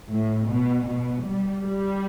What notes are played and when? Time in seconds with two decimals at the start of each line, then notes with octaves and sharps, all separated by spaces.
0.10 A2
0.49 B2
0.88 B2
1.25 G3
1.65 G3